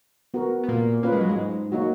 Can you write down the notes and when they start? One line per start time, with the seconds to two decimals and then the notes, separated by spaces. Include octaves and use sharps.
0.34 B3 F#4 A#4
0.64 B3
0.68 A#2 A#3
1.03 A#3 C#4 F4 B4
1.12 G#3
1.20 F#3
1.29 G#2 G#3
1.72 F#3 A#3 D#4 F#4